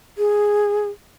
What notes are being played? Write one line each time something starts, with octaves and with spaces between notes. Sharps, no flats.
G#4